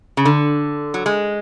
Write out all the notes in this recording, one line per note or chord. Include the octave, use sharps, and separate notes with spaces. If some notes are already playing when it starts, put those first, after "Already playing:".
C#3
D3
F#3
G#3